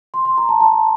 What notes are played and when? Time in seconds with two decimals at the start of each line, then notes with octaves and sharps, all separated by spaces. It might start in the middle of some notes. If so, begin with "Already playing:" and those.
0.14 C6
0.25 C6
0.38 A#5
0.49 A5
0.61 A5